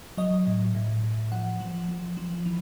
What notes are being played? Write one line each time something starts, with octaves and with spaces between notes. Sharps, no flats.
F#3 D#5
A2
A2
A2
F3 F#5
F3
F3
F3
E3